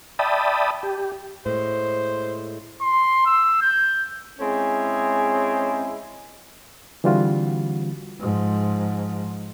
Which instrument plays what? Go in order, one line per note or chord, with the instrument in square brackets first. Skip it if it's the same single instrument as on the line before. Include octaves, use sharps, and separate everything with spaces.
[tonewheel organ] D5 E5 G5 A5 B5 D#6
G4
[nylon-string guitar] A2 G#3 [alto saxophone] C5
[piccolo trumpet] C6
E6
G6
[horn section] G#3 C4 C#4 E4 G#4
[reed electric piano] D3 E3 G3 C4 F4 F#4
[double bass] G#2 F3